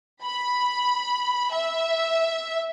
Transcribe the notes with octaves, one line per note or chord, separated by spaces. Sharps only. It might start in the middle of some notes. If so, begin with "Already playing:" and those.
B5
E5